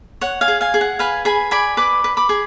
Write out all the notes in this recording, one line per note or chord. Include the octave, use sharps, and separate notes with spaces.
C#5 F#5
F5 G#5
G#4
F5 G#5
G#4
F#5
B4 F5 G#5
G#4 G#5 B5
D5 G#5 B5
B4 B5 D6
B4
B5 D6
G#4